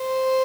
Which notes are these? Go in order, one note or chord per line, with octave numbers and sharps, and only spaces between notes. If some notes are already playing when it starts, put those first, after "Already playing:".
Already playing: C5